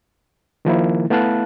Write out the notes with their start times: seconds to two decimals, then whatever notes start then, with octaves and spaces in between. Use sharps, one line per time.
0.65 D#3 F3 A#3 E4
1.10 A3 B3 E4 F5 A5 F#6